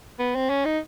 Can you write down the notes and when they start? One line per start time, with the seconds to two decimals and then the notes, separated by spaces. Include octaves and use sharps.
0.19 B3
0.35 C4
0.49 C#4
0.65 D#4